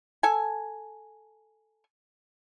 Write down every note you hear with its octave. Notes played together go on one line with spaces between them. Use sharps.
A4 G#5